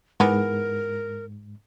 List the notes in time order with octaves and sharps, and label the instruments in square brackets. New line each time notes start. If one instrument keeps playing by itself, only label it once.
[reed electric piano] G#2 [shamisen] E3 B3 [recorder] A#4